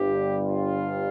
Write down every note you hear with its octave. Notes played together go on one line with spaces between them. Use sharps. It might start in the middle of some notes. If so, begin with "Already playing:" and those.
Already playing: G1 G2 G3 G4
F4